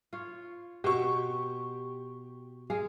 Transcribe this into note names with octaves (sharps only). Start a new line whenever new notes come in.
F4 C#5
B2 G4 C5 G5 C#6
G#3 G#4 F5